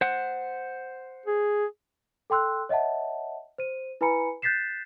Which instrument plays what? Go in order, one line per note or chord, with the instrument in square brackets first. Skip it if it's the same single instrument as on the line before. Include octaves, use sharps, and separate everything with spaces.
[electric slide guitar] C5 F#5
[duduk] G#4
[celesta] A4 G5 C6 E6 F#6
C#5 D#5 E5 F#5 A5
C5 D#7
E4 B4 G#5 A#5 B5 C#7
F#6 G6 A6 B6 C7 E7